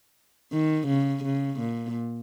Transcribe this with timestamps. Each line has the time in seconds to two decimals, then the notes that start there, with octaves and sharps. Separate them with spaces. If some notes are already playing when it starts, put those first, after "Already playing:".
0.52 D#3
0.88 C#3
1.24 C#3
1.60 A#2